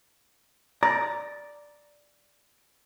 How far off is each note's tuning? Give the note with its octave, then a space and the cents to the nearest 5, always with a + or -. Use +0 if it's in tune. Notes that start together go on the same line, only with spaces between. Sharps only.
D5 +0 A#5 +0